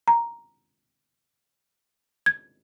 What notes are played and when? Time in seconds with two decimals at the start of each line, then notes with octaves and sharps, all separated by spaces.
0.08 A#5
2.26 G#6